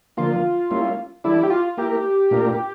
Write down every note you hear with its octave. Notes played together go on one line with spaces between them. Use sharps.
D3 F3 A#3 F4
G3 A#3 C#4 E4
E3 G3 D4 E4 A4 D5
G4
F4
A#3 E4 G4 A#4
A#2 A3 D4 F4 A#4